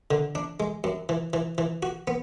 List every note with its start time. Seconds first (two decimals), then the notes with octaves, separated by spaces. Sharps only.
0.11 D3
0.35 D4
0.60 G#3
0.84 F#2
1.09 E3
1.33 E3
1.58 E3
1.83 F#4
2.07 B3